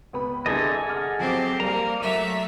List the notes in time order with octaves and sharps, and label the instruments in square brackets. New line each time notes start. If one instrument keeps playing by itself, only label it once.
[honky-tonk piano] C#2 B3 B5
[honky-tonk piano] C2 D3 [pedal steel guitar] G#4 A4 D#5
[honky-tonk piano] F#5 D6 F6
[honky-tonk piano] F3 F#3 [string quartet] C4 G4
[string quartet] G3 A#3 [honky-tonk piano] A#4 F5 [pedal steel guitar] A#5
[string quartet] F#3 A3 E5 [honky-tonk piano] D6 D#7